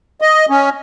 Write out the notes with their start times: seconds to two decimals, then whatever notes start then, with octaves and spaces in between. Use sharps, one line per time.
0.21 D#5
0.50 C#4